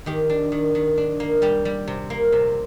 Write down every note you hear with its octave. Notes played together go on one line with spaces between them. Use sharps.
D#3 G4
D4
D#3
D#3
D4
A#3
G3 G4
G3
C3
A#3
C3